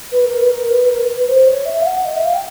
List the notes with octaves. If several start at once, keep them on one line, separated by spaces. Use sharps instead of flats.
B4
A#4
B4
A#4
B4
A#4
B4
B4
C5
C#5
E5
F5
F#5
D#5
E5
F5
G5